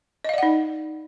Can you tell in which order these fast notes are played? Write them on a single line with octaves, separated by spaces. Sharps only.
D#5 F5 D5 F#5 D#4